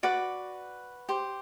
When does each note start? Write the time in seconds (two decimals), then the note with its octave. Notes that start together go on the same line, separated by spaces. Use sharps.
0.03 F#4 B4 D5 D6
1.09 G4 C5